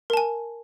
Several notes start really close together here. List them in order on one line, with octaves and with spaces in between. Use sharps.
A#4 A5 G#5